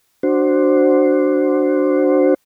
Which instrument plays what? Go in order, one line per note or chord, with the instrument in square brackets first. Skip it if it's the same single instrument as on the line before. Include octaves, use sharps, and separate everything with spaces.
[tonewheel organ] D4 F#4 C5